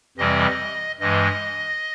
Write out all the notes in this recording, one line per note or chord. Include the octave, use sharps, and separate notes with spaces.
F2 C3 E3 G3 C4 D#5
G2 E3 G#3 D#5